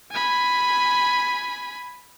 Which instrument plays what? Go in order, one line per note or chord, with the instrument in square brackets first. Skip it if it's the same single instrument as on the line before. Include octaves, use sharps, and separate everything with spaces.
[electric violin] G#5 B5